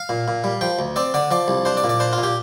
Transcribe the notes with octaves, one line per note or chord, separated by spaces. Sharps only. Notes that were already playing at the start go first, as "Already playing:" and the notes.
Already playing: F5
A#2
A#2
G3
F3 G5
D2
C4 D5
D3 D5
F3 D5
C2
D4 C5
D5
A#2
D5
D4 C5
F4
A#2
G4